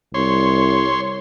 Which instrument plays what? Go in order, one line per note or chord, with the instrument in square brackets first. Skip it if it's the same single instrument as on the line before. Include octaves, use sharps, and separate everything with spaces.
[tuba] C2 [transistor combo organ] C#5 C6